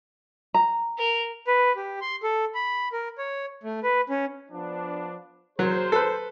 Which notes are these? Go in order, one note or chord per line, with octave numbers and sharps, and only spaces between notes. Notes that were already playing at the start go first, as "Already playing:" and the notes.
A#5
A#4
B4
G4
C6
A4
B5
A#4
C#5
A3
B4
C#4
F3 B3 D4
F#3 G#4 A#4 C5
A4 B4